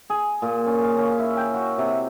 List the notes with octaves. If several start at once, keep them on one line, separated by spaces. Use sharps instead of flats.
G#4
A#2
C#4
F5
C#4
E4
G5
F#4
C3